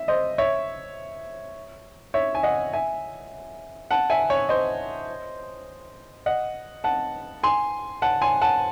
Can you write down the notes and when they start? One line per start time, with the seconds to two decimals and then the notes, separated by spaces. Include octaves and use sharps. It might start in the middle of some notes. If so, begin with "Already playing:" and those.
Already playing: E5
0.08 C5 D#5
0.38 C#5 E5
2.14 C#5 E5
2.35 G#5
2.43 D#5 F#5
2.73 E5 G#5
3.91 F#5 A5
4.10 E5 G#5
4.30 C#5
4.49 C5 D#5
6.26 D#5 F#5
6.84 F#5 A5
7.43 G#5 C6
8.02 F#5 A5
8.22 G#5 C6
8.41 F#5 A5